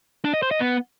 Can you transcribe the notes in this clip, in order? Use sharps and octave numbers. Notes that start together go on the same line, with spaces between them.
D4
D#5
C5
D#5
B3